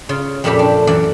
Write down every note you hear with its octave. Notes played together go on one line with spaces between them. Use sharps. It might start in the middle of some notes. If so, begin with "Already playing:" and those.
C#3 F4
F2 A#2 A3 C#4 G4 B5
D4
F#2 E3 D5 F#5